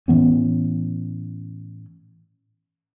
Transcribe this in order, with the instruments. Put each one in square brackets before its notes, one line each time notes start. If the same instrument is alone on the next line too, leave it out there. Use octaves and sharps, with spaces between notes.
[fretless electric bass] A2 E3 B3 C#4